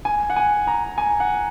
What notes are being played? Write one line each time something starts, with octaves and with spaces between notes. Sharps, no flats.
G#5
F#5
G#5
A#5
G#5
F#5